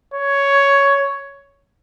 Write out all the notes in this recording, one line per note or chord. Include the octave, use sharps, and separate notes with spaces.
C#5